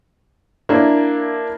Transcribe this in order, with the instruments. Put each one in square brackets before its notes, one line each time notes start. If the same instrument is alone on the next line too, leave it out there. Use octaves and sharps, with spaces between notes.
[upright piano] A#3 D4 E4